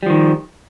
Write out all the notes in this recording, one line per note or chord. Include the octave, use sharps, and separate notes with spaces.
D#3 F3 G3